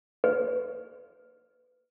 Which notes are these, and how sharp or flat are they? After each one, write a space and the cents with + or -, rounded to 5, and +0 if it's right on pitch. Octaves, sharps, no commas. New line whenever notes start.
B4 +20